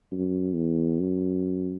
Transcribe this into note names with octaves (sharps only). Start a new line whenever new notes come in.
F#2
E2
F#2